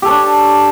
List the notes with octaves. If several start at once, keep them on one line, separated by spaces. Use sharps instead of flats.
D4 G4 A4 C#5